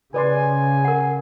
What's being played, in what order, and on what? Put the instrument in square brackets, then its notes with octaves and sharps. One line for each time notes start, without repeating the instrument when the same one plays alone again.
[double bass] C#3 [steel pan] B4 D5 C6 [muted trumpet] G#5
[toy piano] A#4 F#5